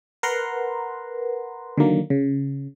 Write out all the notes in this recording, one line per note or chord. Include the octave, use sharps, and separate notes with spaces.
A#4 B4 F#5 A#5 C6
D3 D#3 F#3 A#3
C#3